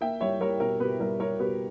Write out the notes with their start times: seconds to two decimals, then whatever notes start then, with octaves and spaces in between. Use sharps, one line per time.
0.01 A#3 E5 G5
0.20 G3 C#5 E5
0.40 G3 A#4 C#5
0.60 B2 A#4
0.80 B2 G4 B4
1.00 G3 A#4
1.20 G3 A#4 C#5
1.39 B2 G4 B4